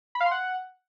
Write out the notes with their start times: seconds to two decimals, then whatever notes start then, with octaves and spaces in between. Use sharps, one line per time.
0.15 B5
0.20 F5
0.26 C6
0.31 F#5